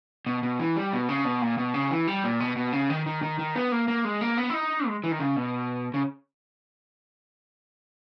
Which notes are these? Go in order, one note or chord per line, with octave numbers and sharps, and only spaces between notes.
B2
B2
E3
G3
B2
C#3
B2
A#2
B2
C#3
E3
G3
A#2
B2
B2
C#3
D#3
D#3
D#3
D#3
B3
A#3
A#3
G#3
A#3
B3
E4
D#4
G#3
E3
D#3
C#3
B2
C#3